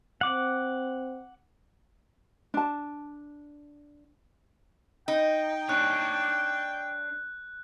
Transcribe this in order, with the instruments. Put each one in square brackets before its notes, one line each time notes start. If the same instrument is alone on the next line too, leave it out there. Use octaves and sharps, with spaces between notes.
[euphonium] C4 [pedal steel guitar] F#5 D6
[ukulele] D4 A5
[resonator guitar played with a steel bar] D#4 [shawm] G5
[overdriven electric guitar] D4 C#5 [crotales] F#6